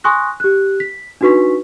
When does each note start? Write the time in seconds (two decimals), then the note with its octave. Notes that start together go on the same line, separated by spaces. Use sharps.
0.04 G#5 C6 C#6 D#6 F#6 A#6
0.40 G4 F#6
0.80 B6
1.21 D4 D#4 F#4 B4 C#6 B6